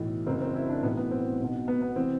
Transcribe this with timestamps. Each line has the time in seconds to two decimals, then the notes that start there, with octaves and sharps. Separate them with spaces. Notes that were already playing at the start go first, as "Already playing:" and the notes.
Already playing: B1 A2 E3
0.27 F#1 F#2 E3 C4
0.41 C4
0.55 E4
0.69 D4
0.83 B1 A2 E3 B3
0.97 B3
1.11 C4
1.40 B1 B2
1.68 B3
1.82 B3
1.96 C3 E3 C4